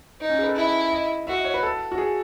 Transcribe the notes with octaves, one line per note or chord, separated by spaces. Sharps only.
D#4
C#4
G#4
B4
A4
E4 D#5
D#5
F#4 E5
D#5
C#5
B4
A4
F#4
G#4